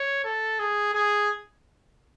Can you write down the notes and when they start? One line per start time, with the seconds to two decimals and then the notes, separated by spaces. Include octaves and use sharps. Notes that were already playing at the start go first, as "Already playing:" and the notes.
Already playing: C#5
0.25 A4
0.59 G#4
0.94 G#4